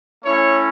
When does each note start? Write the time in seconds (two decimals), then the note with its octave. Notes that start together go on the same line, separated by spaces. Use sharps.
0.24 A3 C#4 E4 C#5